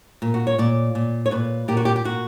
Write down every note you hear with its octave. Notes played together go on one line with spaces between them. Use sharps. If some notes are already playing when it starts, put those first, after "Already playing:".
A#2
F#4
C#5
A#2 D5
A#2
C#5
A#2 B4
A#2 G4
F#4
G4
G4
A#2 F#4